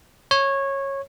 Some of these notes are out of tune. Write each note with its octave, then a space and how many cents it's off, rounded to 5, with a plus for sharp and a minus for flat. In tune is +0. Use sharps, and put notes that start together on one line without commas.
C#5 -15